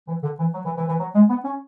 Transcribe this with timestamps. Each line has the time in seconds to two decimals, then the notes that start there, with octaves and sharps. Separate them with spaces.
0.08 E3
0.23 D3
0.39 E3
0.54 F#3
0.65 E3
0.77 E3
0.89 E3
1.00 F#3
1.15 G#3
1.30 B3
1.45 C#4